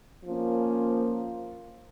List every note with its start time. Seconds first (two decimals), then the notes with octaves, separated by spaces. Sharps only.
0.24 F3 A#3 C#4